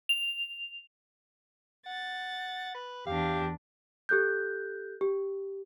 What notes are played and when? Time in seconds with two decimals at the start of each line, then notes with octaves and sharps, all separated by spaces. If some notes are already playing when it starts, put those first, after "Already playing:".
0.09 F7
1.86 F#5 A6
2.75 B4
3.07 E2 D4 G4 F5
4.09 G4 A4 F#6 G6
5.01 G4